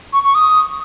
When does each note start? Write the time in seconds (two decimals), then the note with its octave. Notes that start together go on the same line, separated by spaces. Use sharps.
0.13 C#6
0.25 C#6
0.35 D#6